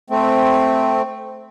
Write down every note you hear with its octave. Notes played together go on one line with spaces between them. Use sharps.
A3 C4